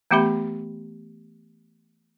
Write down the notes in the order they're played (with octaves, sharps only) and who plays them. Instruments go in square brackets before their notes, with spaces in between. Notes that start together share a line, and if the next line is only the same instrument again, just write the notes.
[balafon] E3 A3 B3 G4 E5 B5